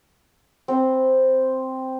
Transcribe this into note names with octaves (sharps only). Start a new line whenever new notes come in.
C4 C5 B5